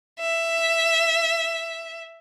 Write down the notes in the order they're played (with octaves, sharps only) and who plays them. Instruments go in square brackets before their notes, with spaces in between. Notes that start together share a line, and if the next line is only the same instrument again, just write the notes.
[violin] E5